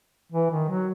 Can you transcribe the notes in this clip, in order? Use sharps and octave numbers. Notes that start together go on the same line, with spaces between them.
E3
D#3
F#3